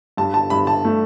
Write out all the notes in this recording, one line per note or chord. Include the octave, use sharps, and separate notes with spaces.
G2 A5
A5
G2 B5
A5
A3